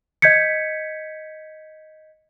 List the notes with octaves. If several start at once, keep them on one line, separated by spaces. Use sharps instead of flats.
D#5 G6 G#6 B6 C#7